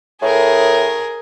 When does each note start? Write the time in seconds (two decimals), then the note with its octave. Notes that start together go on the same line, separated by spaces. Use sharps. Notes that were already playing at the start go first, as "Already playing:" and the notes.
0.22 A2 G#4 A#4